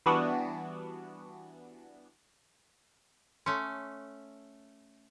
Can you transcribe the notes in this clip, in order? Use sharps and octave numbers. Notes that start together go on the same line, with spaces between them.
E3 G3 B3 D4 F#4
A3 C#4 C6